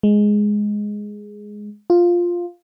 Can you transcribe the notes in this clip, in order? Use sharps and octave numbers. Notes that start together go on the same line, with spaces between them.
G#3
F4